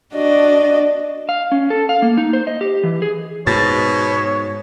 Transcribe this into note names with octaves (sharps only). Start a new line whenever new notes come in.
D4 F#4 D5 D#5
F5
C#4
A4
F5
A#3
D#4
C5
D#5
G4
E3
G#4
G#2 B2 C#5 A6